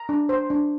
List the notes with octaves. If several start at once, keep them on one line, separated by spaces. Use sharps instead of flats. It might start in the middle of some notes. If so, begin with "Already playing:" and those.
Already playing: A#5
D4
C5
D4